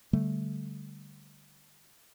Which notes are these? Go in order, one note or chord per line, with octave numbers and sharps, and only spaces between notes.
D3 G3 A3